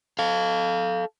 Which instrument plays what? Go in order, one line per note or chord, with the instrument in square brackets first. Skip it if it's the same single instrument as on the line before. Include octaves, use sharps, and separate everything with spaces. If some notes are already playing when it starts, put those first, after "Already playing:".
[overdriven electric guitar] A4 F5